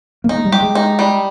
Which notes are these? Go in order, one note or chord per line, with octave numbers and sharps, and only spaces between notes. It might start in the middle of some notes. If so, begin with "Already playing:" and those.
A#3
G#3 D#4
G3
G4
G#3
D#4
G3